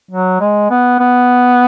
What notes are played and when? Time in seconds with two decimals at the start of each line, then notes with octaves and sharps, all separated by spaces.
0.11 F#3
0.40 G#3
0.71 B3
1.00 B3